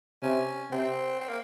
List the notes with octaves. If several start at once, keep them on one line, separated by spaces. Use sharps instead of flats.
C3 C#4
C3 C4
C4
A#3